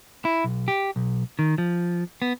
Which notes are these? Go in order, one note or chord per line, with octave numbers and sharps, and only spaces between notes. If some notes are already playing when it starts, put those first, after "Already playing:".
E4
B1
G4
B1
D#3
F3
B3